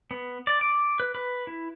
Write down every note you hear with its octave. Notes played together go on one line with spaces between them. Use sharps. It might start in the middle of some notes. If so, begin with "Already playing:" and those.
B3
D5
D6
B4
B4
E4